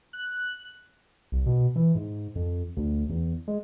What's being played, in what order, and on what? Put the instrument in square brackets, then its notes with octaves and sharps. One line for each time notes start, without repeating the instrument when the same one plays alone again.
[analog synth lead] F#6
[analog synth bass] C2
B2
E3
G#2
F2
D2
E2
G#3